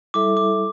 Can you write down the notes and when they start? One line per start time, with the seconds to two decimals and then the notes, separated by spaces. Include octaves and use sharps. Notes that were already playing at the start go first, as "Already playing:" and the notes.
0.14 G3 E4 A4 E5 D6
0.37 D6